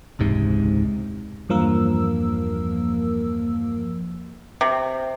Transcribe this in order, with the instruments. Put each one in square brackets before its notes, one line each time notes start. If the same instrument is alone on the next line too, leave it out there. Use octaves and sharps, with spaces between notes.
[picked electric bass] E1 C#2 G#2 C3
[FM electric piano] E2 G2 F3 A#3 A#4 E6
[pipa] C3